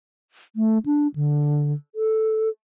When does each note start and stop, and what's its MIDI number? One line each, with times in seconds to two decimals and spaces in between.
0.56 0.78 57
0.86 1.07 62
1.16 1.73 50
1.95 2.49 69